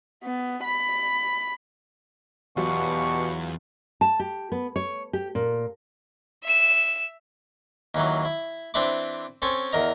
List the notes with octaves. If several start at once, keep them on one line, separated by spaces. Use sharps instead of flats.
B3
B5
E2 B2 F#3 F4 G4 C#6
A5
G4
B3
C#5
G4
A#2
E5 E7
D#2 E3 F#3
E4
E3 C4 D4 E5 B5 D6
C4 C#4 A4 G#5
E2 A#4 D#5 A#5